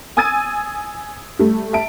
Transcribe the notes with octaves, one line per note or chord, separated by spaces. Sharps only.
G#5 D#6 E6 G#6 A6 D#7
G3 A3
E5 A5 D7